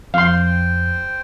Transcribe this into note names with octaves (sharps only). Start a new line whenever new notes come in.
F2 C5 F5 G5 C6